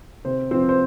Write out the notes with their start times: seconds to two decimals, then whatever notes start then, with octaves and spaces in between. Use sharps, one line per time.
0.25 C3 C4 C5
0.51 F3 C4 C5
0.69 C5